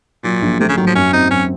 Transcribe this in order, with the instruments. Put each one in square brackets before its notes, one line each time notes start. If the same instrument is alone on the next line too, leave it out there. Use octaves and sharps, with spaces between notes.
[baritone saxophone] A#2 [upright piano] F#3
[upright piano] A#1
[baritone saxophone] C3 [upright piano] A3
[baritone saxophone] C#3
[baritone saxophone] D#3 [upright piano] F#3
[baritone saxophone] F3
[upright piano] F#2 [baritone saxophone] C#4
[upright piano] C4 [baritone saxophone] D#4
[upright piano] F#2 [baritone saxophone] C#4